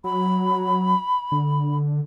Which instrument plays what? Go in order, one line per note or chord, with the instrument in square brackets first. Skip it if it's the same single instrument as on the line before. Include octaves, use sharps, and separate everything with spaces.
[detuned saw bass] F#3 [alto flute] B5
[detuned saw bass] D3